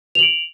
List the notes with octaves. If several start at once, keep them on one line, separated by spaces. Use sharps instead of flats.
D7 F7 F#7